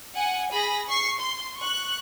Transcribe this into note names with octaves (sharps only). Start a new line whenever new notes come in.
F#5 G#5
G#4 B5 A#6
C#6 C7
C6
C#6 F#6